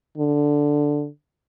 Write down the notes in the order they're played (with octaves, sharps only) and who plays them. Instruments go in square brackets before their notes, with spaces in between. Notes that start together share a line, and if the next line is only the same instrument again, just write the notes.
[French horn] D3